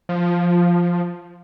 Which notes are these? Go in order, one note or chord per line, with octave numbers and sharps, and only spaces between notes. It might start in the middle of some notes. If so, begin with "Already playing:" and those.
F3